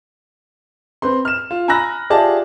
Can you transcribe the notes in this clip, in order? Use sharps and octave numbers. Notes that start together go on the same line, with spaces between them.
C4 B4 C6
F6 E7
F4
G#5 A#5 B5 E6 F#6 A#6
F4 G4 G#4 D5 E5 A5